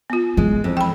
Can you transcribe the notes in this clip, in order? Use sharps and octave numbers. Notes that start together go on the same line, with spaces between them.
B3 F4
E3 G#3
F2
G5 B5